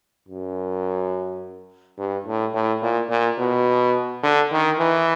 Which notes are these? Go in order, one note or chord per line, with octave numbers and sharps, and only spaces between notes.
F#2
G2
A2
A2
A#2
A#2
B2
D3
D#3
E3